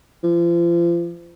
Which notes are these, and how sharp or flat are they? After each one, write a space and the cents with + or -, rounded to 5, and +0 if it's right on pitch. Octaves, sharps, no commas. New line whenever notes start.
F3 -35